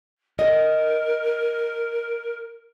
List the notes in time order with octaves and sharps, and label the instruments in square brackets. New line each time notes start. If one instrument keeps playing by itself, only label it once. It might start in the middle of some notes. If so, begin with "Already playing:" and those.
[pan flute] A#4 [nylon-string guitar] D#5